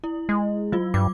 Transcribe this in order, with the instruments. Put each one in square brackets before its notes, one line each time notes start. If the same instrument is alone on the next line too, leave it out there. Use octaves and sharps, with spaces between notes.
[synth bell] E4
[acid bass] G#3
[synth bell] F#3 F4
[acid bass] G2 [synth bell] D6